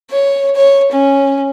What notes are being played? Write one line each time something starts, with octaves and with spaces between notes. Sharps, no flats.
C#5
C#5
C#4